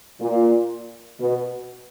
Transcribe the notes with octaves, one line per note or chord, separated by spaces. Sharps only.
A#2
B2